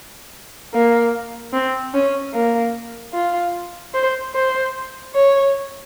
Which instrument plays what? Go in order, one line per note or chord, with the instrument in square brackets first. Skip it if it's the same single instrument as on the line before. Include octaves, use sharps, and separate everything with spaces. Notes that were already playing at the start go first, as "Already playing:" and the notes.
[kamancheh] A#3
C4
C#4
A#3
F4
C5
C5
C#5